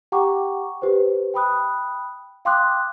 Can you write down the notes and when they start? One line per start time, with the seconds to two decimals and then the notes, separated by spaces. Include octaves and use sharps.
0.12 G4 F#5 G5 A#5 C#6 D6
0.82 G4 B4 C5
1.34 G5 B5 D#6 F#6
2.45 F5 G5 C6 D6 D#6 F#6